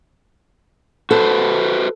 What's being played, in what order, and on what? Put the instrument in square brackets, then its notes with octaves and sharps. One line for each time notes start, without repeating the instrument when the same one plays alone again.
[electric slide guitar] F#4 B4 C5 [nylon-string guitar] A4